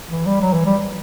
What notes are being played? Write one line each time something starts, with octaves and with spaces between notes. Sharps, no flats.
E3
G3
F#3
E3
G3